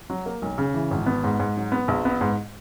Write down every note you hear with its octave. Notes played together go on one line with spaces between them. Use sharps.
F#3
A#3
B1
C#3
E3
G#1
B3
G#2
G#2
F#3
B3
A#1
B3
G#2